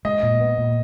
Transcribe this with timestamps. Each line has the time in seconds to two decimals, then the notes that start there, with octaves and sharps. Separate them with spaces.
0.05 G#3 D#5
0.23 A#2
0.40 B3
0.58 A#2